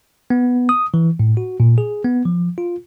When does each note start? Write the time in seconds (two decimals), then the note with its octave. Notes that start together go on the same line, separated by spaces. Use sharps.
0.30 B3
0.69 D#6
0.94 E3
1.20 A2
1.37 F#4
1.60 A#2
1.78 G#4
2.04 B3
2.25 F3
2.58 F4